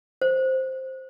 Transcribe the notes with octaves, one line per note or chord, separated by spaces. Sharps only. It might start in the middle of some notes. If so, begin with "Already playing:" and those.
C5